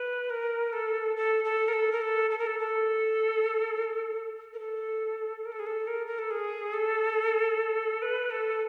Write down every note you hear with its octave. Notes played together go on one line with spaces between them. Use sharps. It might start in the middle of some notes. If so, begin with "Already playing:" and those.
Already playing: B4
A#4
A4
A4
A4
A#4
A4
A#4
A4
A4
A#4
A4
A4
A#4
A4
A#4
A4
G#4
A4
A#4
A#4
A4
G#4
A4
B4
A4